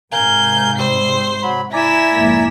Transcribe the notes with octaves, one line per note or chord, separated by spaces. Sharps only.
G#2 C3 A#4 F5 G#5 G6
G3 C4 C5 C7
F#3 B5
E4 D5 G#5 A#5 B6 E7
F1 G#2 A#3